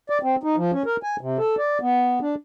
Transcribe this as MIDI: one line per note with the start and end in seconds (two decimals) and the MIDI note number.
0.10 0.18 74
0.23 0.36 60
0.43 0.56 63
0.56 0.71 53
0.73 0.83 61
0.86 0.96 70
1.03 1.16 80
1.21 1.38 48
1.38 1.55 69
1.58 1.78 74
1.81 2.19 59
2.21 2.35 62